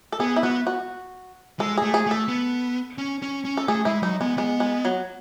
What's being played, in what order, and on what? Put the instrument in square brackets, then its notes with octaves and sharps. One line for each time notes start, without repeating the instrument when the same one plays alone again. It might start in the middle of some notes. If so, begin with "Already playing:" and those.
[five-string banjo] A4
[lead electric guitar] B3 [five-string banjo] G#4
[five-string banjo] E4
[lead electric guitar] B3 [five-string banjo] F#4
[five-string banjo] F#4
[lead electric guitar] G#3 [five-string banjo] A4
[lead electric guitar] A3 [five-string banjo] G#4
[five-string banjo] G#4
[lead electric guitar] A3 [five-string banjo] A4
[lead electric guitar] B3
C#4
C#4
C#4
[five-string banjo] A4
[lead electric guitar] A3 [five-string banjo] G#4
[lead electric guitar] G#3 [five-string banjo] E4
[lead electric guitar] F#3 [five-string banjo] D#4
[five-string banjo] G#3 [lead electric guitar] B3
[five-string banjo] G#3 [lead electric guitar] B3
[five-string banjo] G#3
F#3